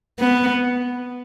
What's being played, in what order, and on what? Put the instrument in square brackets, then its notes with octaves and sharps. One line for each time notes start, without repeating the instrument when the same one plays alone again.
[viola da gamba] B3